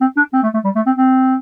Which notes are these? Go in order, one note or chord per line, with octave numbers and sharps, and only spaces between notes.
C4
D4
C4
A3
A3
G3
A3
C4
C4